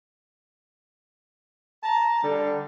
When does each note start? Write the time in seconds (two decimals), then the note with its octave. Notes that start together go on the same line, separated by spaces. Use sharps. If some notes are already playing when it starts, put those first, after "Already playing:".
1.83 A5 A#5
2.22 D3 G3